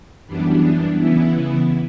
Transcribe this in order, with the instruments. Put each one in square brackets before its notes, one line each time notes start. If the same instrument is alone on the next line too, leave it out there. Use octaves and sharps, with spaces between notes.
[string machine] F#2 E3 G3 B3 D4
C#3 E3 B3 E4